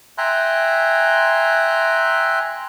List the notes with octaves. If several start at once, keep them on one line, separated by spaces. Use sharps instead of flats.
E5 G5 G#5 A#5 C6 F#6